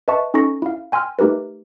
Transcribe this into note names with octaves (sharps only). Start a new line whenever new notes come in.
B4 D#5 E5 A5 C#6
C#4 D#4 A4 C#6 A#6
E4 F5
G5 G#5 C6 E6 F6
A3 D#4 G4 A#4 B4